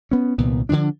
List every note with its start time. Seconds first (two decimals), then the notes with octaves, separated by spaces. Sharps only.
0.11 B3 C#4
0.38 C2 A#2 D#3 B3
0.69 D3 D#3 F3 D4